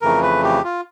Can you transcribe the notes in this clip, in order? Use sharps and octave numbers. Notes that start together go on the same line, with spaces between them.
F2 C#3 E3 A3 A#4
B4
G4
F4